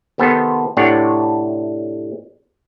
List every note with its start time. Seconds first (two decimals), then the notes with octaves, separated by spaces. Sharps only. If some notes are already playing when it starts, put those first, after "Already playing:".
0.18 C3 D#3 B3 A4 C5
0.77 A2 C3 D4 C#5 F#5